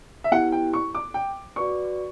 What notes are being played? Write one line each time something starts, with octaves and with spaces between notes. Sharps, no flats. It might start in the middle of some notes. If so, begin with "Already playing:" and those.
E5
B3 E4 G4 F#5
G5
C#6
D6
G5
F#4 B4 D5 C#6